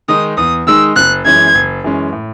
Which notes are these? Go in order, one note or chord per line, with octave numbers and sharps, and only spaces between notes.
D#3 G#3 D#4 D#6
E2 D#6
D#3 G#3 D#4 E6
F#1 F#6
F#2 E3 G#3 C#4 G#6
F#1
F#2 E3 G#3 C#4
A2